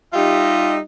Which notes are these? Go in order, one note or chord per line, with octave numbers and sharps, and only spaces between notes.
G3 D#4 F4 G4 D#5 E5